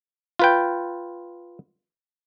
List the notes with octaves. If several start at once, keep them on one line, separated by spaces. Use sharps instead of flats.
F4 B4 G5